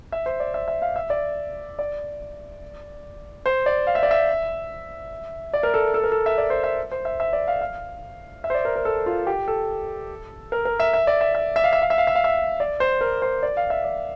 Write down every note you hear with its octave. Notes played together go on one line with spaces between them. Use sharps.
E5
C5
D5
E5
E5
F5
E5
D5
D5
C5
D5
F5
E5
D5
E5
D5
A#4
A4
A4
A#4
A4
E5
D5
C5
E5
C5
E5
E5
D5
F5
F5
E5
C5
D5
A#4
A#4
A4
F4
G4
A4
A#4
A#4
E5
E5
D5
E5
E5
E5
F5
E5
F5
E5
F5
E5
F5
E5
D5
C5
A#4
C5
D5
F5
E5
D5